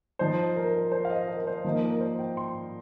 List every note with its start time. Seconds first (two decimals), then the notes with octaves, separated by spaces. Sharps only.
0.19 F3 D#4 C5
0.56 A#4
0.75 A#4
0.92 C5
1.05 F5
1.10 D#5
1.28 A#4
1.42 D#5
1.47 C5
1.64 F3 A#3 D#4 A#4
1.83 A#4
2.00 C5
2.19 G5
2.37 C6